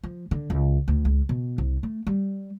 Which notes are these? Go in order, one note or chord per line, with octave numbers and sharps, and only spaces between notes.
F3
D3
C#2
D2
C#2
B2
C2
A3
G3